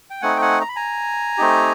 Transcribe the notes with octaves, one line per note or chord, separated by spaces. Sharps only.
G5
A3 C4 D#4 F#5 G#5
G5
F#5 G#5
A#5
B5
G#5 A#5
A3 C4 D#4 G4